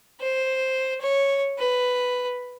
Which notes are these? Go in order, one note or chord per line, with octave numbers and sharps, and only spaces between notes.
C5
C#5
B4